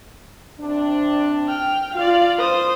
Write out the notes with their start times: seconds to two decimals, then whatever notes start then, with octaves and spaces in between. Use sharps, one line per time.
0.60 C3 C4 D4
1.48 G5 F6
1.95 F4 D5 F5
2.38 C5 D#6